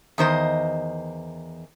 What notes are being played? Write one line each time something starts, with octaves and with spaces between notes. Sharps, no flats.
E2 D#3 C5 D#5